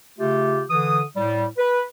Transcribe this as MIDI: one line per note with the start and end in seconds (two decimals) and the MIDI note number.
0.18 0.62 49
0.18 0.62 57
0.18 0.62 65
0.18 0.62 67
0.69 0.99 50
0.69 0.99 52
0.69 0.99 87
1.16 1.45 45
1.16 1.45 55
1.57 1.81 71